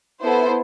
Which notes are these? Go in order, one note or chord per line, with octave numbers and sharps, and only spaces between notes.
B3 E4 A4 C5